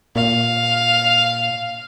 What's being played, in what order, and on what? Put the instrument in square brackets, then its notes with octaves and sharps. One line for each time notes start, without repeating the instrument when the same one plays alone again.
[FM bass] A#2 [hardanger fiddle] F5